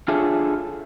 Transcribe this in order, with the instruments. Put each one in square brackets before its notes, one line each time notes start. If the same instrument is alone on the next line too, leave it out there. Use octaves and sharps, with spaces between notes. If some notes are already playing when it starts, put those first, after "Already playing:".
[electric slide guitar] D4 F4 G#4 A4 C#5 E5